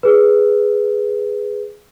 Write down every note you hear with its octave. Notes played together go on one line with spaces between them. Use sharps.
G#4 B4